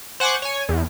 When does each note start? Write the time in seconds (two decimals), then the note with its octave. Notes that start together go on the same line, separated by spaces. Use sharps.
0.20 C5 F#5 G#5 C#6 D6
0.42 C#5 G#5
0.69 E2